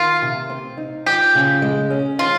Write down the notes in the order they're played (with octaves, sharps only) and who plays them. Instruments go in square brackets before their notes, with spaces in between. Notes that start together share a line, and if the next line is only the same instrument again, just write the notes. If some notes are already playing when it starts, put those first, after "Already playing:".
Already playing: [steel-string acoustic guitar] D#3 [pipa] F4
[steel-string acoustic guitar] C3
C4
D#4
[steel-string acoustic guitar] F3 [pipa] G4
[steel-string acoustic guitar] C#3
G#3
C#4
[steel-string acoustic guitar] D#3 [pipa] F4